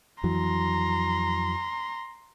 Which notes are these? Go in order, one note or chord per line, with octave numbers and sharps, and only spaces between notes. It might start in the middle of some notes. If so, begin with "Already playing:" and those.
F2 E3 F#3 A#5 C6